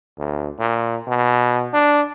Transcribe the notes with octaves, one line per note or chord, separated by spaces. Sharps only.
D2
A#2
B2
D4